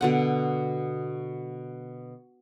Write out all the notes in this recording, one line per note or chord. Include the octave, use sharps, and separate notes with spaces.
B2 D3 F#5